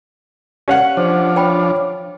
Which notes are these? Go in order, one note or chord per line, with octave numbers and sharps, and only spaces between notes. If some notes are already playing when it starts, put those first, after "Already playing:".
C#4 G4 C#5 F5 F#5
F3 D4 C5
C5 C#5 G5 B5